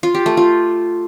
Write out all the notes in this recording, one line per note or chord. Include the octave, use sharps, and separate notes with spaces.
F4
G4
A3
F4